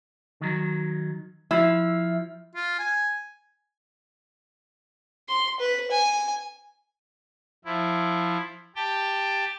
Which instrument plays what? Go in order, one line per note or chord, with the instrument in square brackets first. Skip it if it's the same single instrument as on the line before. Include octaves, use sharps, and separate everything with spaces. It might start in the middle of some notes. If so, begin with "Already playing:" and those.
[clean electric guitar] D#3 F#3
[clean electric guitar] F3 [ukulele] E4 [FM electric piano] E5
[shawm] F4
G#5
[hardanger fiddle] C6
B4
G#5
[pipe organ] F3 E4
G4 G5 A5